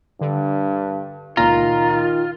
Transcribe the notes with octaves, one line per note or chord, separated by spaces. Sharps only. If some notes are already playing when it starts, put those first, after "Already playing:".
G2 D3
C#2 A#2 D#3 F4 A#5